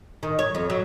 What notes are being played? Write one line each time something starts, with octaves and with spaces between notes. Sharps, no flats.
D#3
C#5
F2
F#3